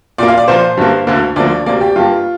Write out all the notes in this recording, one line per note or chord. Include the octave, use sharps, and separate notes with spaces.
A#2 A#3 D5
F5
D5
A#2 F3 A#3 C5
G2 D3 A#3
D2 D3 A#3
D2 D3 F3 A#3 D5
D2 C3 A#3 D5
G4
G2 G3 A#3 F4